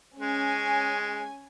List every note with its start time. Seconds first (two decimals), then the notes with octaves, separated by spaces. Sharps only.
0.19 G#3 C#4 G#5